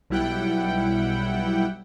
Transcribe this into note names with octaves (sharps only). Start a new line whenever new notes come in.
B1 G3 E4 F#5 G5